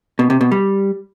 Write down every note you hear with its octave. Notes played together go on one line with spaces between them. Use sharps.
B2
C3
B2
G3